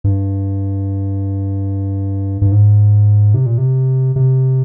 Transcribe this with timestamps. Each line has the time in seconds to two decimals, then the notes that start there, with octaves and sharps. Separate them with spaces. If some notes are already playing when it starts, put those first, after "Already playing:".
0.04 G2
2.41 G2
2.52 G#2
3.34 C3
3.46 A#2
3.58 C3
4.16 C3